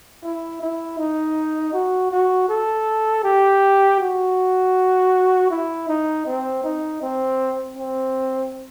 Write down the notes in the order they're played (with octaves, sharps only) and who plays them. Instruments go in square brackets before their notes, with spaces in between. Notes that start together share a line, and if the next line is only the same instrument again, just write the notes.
[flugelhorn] E4
E4
D#4
F#4
F#4
A4
G4
F#4
E4
D#4
C4
D#4
C4
C4